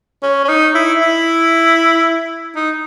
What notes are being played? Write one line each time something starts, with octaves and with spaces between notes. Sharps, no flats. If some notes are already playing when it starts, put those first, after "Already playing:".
C#4
C#4
D#4
E4
E4
D#4